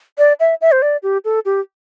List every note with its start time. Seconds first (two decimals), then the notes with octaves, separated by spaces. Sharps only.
0.18 D5
0.40 E5
0.61 E5
0.72 C5
0.82 D5
1.03 G4
1.25 A4
1.45 G4